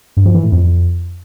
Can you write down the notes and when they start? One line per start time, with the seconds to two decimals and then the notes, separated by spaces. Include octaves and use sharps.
0.17 G2
0.26 F3
0.34 E3
0.43 A2
0.52 F2